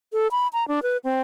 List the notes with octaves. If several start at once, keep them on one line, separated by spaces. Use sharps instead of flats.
A4
B5
A#5
D4
B4
C4